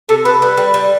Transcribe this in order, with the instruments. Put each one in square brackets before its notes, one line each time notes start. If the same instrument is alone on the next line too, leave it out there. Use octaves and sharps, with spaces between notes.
[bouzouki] C3 [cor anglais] A4
[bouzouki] A4 [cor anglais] B4
[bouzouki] G3 [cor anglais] B4
[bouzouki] G3
G3